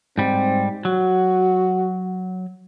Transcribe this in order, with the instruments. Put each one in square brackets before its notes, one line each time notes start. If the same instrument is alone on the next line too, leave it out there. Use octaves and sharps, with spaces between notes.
[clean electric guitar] G#2 G3 [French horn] C4
[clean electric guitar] F#3 [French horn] F#4